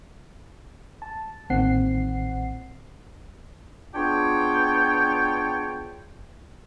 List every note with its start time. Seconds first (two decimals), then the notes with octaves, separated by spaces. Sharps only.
1.02 A5
1.50 A1 A#2 D#3 C4 F#5 C7
3.95 B3 D4 F4 G#4 C#5 G5